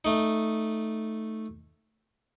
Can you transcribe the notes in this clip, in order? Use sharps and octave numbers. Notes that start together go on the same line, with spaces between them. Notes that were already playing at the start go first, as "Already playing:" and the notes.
A3 D#4